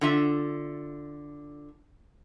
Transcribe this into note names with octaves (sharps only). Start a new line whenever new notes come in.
D3 F4 E5